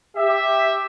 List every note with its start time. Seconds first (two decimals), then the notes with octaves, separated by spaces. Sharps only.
0.17 G4 E5